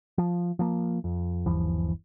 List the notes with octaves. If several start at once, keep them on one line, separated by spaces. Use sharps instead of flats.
F3
F3 A#3
F2
G1 D#2 E3 F3